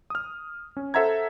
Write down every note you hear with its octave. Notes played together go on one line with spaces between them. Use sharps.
D#6 F6
C#4
A4 C5 E5 F#5 A#5 G#6